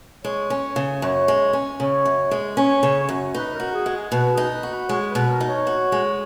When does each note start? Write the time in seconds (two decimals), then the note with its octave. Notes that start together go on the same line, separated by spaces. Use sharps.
0.24 G#3 C#5
0.50 C#4
0.76 C#3
1.02 F#2 C#5
1.28 G#3
1.53 C#4
1.80 C#3 C#5
2.05 F#2
2.31 G#3
2.57 C#4 C#5
2.83 C#3
3.09 F#2
3.34 D#4 B4
3.53 A#4
3.60 F#4
3.73 G#4
3.86 G#3
3.92 G#4
4.11 B2 F#4
4.31 G#4
4.37 D#4
4.50 B4
4.63 F#4
4.70 B4
4.89 G#3 C#5
5.09 B4
5.15 B2
5.28 A#4
5.40 D#4
5.48 C#5
5.67 F#4
5.92 G#3